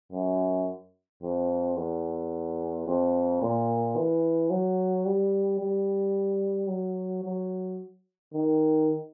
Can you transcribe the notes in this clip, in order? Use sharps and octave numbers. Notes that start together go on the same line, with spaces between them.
F#2
F2
E2
F2
A#2
E3
F#3
G3
G3
F#3
F#3
D#3